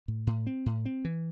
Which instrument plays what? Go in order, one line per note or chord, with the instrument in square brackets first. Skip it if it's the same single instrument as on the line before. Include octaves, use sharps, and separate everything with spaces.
[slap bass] A2
A2
C4
A2
C4
E3